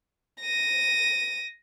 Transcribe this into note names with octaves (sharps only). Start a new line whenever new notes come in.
A#6 D#7